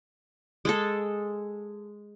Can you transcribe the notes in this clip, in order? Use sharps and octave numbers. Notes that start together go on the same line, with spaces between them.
G#3 G#4 A4